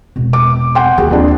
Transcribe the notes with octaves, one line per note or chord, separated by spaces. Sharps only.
E1 B2
D6
F#5 G5 C6
D#2 F#4 G#4
F2 D4